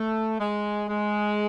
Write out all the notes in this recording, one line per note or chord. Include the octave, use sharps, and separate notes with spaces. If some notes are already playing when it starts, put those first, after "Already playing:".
Already playing: A3
G#3
G#3